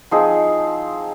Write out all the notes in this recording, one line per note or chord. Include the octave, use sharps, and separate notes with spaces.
F3 C4 D#4 G#4